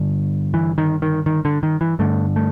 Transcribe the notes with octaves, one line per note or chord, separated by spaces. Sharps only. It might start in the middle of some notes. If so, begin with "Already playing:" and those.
Already playing: G2 D3
E3
D#3
D#3
D#3
D3
D#3
E3
G2 D3 A3
A3